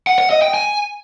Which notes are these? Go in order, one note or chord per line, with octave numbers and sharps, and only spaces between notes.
F#5
F#5
D#5
G5
G#5